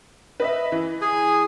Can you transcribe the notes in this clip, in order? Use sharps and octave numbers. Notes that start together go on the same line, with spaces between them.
B4 D#5 E5
E3
G#4 G#5